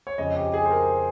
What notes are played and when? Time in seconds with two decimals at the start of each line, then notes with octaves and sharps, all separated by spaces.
0.07 C#5
0.18 F2 C#3 D#5
0.36 G4
0.54 G#4
0.66 C5
0.71 A#4